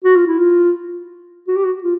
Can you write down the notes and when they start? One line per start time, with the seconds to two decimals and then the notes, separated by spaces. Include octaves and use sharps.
0.04 F#4
0.16 F4
0.27 E4
0.38 F4
1.48 F#4
1.56 G4
1.65 F#4
1.84 F4